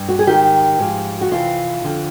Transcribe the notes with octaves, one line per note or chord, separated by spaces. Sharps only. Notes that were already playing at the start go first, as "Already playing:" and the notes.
Already playing: G2
F#4
G#4
G#2 D#3 G4
G#2 F3
F#4
F2 C3 E3 F4
F2 D3 F3